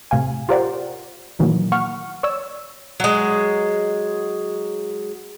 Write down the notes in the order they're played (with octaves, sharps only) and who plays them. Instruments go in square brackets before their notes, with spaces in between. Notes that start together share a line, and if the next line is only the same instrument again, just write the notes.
[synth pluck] A2 C3 F5 G#5
F4 G4 A#4 C5 D5 F#5
A#2 D#3 E3 F#3 A#3
A#3 F#5 C#6 F6
C#5 D5 E6
[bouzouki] F#3 G#3